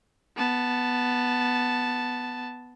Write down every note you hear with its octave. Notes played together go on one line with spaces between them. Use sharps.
B3 A5